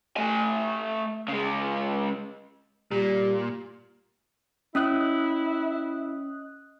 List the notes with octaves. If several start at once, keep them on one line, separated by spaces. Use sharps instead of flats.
A3 G#5
C#3 G#3
A#2 G3
C#4 E4 D#5 D#6 F#6